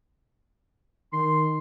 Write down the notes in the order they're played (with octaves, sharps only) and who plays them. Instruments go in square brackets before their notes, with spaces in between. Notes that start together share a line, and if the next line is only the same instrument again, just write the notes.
[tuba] D#3 [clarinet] C6